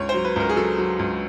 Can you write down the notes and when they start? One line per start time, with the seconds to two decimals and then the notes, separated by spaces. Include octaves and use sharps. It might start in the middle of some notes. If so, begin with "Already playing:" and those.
Already playing: C#2 C#5
0.09 C5
0.14 F#3
0.25 B4
0.36 C#2 A#4
0.49 G#4
0.56 F#3 A4
0.78 F#3
0.99 C#2